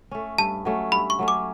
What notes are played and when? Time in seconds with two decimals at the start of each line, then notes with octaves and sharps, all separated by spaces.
0.11 A3 C#4
0.38 G2 A5
0.65 F#3 A3 C#4
0.92 G2 B5
1.10 C#6
1.19 F#3 A3 C#4
1.28 D6